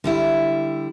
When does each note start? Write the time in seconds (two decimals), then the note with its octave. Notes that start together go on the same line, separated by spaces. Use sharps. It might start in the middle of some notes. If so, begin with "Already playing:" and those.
0.04 D3 G3 E4